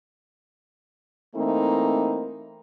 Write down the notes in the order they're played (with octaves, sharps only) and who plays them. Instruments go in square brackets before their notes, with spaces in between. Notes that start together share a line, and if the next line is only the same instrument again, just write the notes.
[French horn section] E3 A3 A#3 C4 D#4